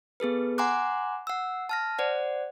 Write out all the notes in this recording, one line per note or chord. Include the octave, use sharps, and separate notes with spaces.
B3 G#4 A4 B4
F#5 G#5 A#5 C6 D6 F#6
F#5 E6
A5 F6 A#6
C5 D5 F#5